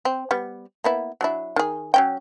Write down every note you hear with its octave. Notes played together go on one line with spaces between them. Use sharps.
C4
G3 B3
A#3 B3 E4
F#3 D4 E4
D#3 G#4
F#3 C#4 G5